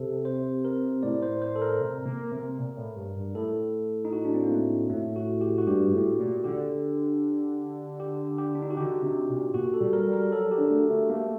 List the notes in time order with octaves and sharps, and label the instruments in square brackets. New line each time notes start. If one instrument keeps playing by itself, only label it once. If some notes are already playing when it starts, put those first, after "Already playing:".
Already playing: [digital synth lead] C3 [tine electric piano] G4 A4
[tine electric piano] C5
A#4
[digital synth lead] A2 [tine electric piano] D5
[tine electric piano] C5
C5
A4
A#4
[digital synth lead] C3
A#3
C3
A#2
A2
G2
G2
[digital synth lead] A2 [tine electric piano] A4
[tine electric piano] D#4
F#4
D4
C4
A#3
A3
[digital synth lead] A2 [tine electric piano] A3
[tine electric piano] F#4
G4
F#4
[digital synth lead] G2 [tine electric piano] G4
[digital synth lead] A2
A#2
[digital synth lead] D3 [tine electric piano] G4
[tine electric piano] G4
G4
D4
D#4
F#4
[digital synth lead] D3 [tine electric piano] G4
[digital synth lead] C3
A#2
[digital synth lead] A#2 [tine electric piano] F#4
[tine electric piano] A4
[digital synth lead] G3
[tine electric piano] A#4
[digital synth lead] G3
[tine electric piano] A#4
[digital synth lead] F#3 [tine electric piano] A4
[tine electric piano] G4
[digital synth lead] D3
[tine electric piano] A3
A3
[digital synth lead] A3 [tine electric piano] A#3